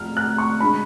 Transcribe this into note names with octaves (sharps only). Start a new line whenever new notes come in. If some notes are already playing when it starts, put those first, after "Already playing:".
Already playing: F2 F3 F6
F#6
C#6
D3 G#3 B5